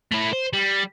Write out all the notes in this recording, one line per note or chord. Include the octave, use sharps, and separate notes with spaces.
A3 E4
C5
G3